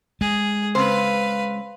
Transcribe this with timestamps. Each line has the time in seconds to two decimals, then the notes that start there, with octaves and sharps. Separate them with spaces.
0.21 G#3 G#4
0.75 C#3 C4 B4 C5 F5